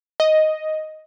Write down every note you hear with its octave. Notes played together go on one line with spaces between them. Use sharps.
D#5